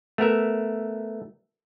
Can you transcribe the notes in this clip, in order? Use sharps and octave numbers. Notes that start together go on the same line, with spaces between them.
A3 B3 A#4 E5